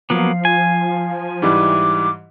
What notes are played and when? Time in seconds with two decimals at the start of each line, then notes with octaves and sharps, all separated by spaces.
0.10 F3 F#3 A#3 B3 F5
0.45 G#5
1.42 G#2 E3 G3 D6